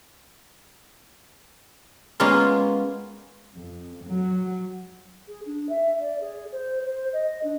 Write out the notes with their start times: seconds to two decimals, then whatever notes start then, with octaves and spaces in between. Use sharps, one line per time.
2.20 G#3 A#3 B3 C#4 F4
3.57 F2
4.06 F#3
5.27 G#4
5.45 D4
5.68 E5
6.00 D5
6.20 G#4
6.52 C5
6.83 C5
7.12 D#5
7.43 D4